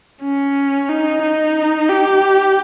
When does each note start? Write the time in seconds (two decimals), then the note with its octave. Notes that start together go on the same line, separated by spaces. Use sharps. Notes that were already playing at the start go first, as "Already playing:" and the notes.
0.23 C#4
0.89 D#4
1.22 D#4
1.89 G4